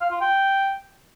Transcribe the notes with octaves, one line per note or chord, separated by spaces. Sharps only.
F5
F4
G5